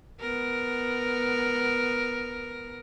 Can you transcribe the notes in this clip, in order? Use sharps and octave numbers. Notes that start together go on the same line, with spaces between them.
B3 A#4